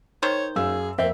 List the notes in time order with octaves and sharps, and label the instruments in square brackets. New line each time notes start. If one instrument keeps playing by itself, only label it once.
[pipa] D#3 C5 [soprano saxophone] C#5
[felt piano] F#2 F5 E6 [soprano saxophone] G#4
[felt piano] F2 A#3 [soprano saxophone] C4 [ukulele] E5